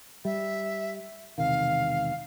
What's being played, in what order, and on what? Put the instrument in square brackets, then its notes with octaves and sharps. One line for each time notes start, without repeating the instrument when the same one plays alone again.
[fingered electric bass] G3 [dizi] E5
[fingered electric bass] E1 C3 D#3 [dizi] F5